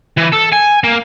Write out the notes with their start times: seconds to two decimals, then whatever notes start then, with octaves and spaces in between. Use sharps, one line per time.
0.17 E3
0.32 A4
0.52 G#5
0.84 A#3